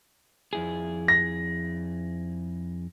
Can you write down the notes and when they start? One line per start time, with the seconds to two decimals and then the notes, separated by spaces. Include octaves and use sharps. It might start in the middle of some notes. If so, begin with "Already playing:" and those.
0.53 F2 E4 G#4
1.08 A#6